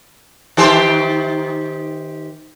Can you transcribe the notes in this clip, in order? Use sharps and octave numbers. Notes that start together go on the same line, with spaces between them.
D#3 G4 C5